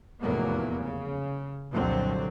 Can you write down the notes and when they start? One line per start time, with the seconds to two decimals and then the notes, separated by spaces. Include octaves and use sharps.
0.21 F1 E2 A2 F#3 A#3 B3
0.78 C#3
1.72 C2 F2 A#2 D3 F#3 C4